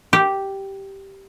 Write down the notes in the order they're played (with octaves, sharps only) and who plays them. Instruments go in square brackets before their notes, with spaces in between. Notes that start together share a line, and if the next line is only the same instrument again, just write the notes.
[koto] G4